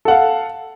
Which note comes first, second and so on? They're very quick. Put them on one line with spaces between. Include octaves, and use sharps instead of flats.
A4 F#5 F5